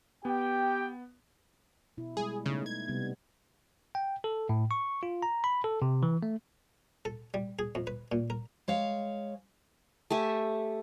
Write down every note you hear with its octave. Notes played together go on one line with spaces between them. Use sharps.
B3 G4 G5
B2 E4
G3 G#3 G#4
C#3 A3 B3 D#4
G#6
C3 G3 B3
G5
A4
A2
C#6
F4
A#5
B5
A4
C3
E3
A3
A4
G3
G#4
F2
B4
A#2
A#4
G#3 C#5 F5
A3 G4 E5 G#5